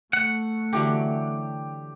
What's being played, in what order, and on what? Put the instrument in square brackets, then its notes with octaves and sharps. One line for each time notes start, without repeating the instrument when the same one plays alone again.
[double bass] A3 [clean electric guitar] F#5
[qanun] D3 E3 F#3 [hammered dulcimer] G4